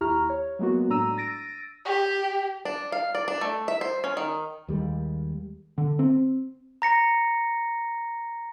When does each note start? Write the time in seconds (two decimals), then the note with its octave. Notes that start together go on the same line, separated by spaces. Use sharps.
0.01 D#2 E4 G4 A#5 C#6 F6
0.30 C#5
0.59 F#3 G#3 A#3 B3 F#4
0.90 A2 D4 A#5 E6 D#7
1.17 E6 A6 A#6 D7 D#7
1.85 G4
2.65 D4
2.92 F5
3.15 D5
3.28 D4
3.41 A3
3.68 E5
3.81 C5
4.04 C#4
4.17 D#3
4.68 D#2 G3 G#3
5.78 D3
5.99 C4
6.82 A#5 A#6 C#7